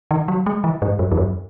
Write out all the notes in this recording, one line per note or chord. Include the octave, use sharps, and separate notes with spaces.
D#3
F#3
G#3
E3
G#2
F#2
E2
F#2